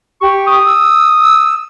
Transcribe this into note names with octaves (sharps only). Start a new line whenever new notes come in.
G4 C#6
D#6
E6
E6